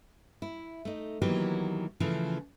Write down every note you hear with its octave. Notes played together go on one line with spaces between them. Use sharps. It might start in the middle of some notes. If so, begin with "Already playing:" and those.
E4
A3 D#4
D#3 E3 F#3 A#3 B3 G4
C#3 E3 F3 A3